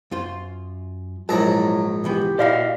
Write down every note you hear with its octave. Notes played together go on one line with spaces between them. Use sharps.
F#2 F4 C5
A#1 G#2 F#3 E4 A5 A#5
C#2 E3 B3 G4
A#2 E4 F#4 D5 D#5 F5